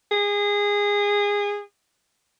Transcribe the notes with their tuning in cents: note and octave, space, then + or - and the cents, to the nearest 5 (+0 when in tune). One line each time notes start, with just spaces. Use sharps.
G#4 -20